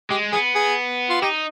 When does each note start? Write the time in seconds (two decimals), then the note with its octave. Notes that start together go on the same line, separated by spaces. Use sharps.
0.10 G#3 G4
0.32 B3 G#4
0.55 G#4
1.10 F4
1.22 D#4 G4